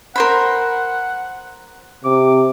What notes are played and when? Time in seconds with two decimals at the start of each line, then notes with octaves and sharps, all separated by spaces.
0.16 A#4 C5 F#5 B5
2.04 C3 D6